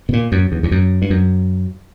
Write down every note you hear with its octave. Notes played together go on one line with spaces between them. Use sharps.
B2
A#2
F#2
E2
E2
F#2
G2
F#2